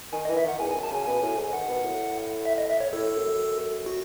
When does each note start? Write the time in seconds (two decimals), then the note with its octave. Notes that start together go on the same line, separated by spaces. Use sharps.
0.13 D#3 G#5
0.25 D#5
0.29 E3
0.37 E5
0.44 D#3 F#5
0.60 E2 G#5
0.71 G#5
0.75 F#2
0.83 A5
0.91 C#3 G#5
1.06 B2 G#5
1.22 A2
1.37 G#2
1.52 D#3 F#5
1.69 B2
1.84 A2
2.45 E5
2.58 D#5
2.70 E5
2.80 C#5
2.93 A2 A4
3.16 F#2
3.86 F#4